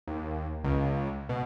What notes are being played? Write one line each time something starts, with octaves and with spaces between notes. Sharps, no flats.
D#2
C#2
B2